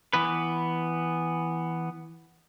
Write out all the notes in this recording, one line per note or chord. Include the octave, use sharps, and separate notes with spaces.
E3 B3 B4